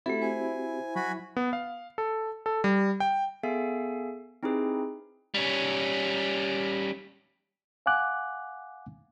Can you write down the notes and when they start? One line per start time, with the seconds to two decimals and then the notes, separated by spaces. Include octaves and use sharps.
0.06 A3 C4 E4 F#4 G4 A4
0.22 C5 G#5
0.96 F#3 F#4 G#5 B5
1.37 B3
1.53 F5
1.98 A4
2.46 A4
2.64 G3
3.00 G5
3.43 B3 G#4 A4 E5 F5 G#5
4.43 C4 D#4 E4 G4 G#4 B4
5.34 G3 C#4
7.86 F5 F#5 G#5 D6 F#6